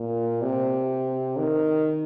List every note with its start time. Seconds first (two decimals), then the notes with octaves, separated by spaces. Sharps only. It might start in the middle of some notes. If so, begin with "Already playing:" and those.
Already playing: A#2
0.42 C3
1.38 D#3